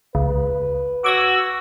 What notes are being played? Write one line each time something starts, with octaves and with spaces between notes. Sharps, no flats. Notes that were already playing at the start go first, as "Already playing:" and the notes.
C#2 B4
F#4 D6 E6 G#6 A#6